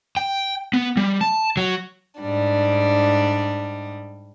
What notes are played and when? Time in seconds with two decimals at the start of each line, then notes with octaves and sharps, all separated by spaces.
0.17 G5
0.73 B3
0.97 G3
1.21 A5
1.57 F#3
2.21 G#2 G3 D4